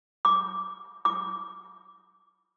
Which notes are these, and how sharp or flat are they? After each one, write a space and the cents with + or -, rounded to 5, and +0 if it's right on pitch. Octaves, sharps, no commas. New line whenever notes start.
D6 -15
D6 -20